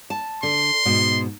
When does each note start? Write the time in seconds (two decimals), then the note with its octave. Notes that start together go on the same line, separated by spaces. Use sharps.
0.10 A5
0.43 D3 C6
0.85 G#2 B2